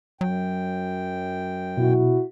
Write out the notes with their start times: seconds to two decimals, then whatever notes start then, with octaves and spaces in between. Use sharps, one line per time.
0.21 F#2 F#3 G5
1.77 B2 E4 F#4